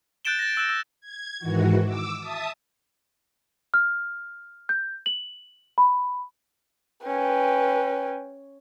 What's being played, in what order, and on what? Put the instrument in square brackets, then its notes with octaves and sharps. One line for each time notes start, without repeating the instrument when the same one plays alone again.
[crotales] F#6 G6 A6 D7 E7 G7
A6 A#6
E6 F#6 E7
E6
[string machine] G#6
G#2 D#3 E3 F#4
D6 E6
E5 A5 D#6
[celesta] F6
G6
F#7
B5
[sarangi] C#4 [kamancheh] B4 G5